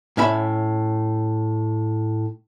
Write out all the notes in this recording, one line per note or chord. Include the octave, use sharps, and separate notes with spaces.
A2 C#4 E5 B5